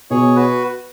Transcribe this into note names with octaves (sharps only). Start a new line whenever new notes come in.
B2 G#4 C#5
F#4 B4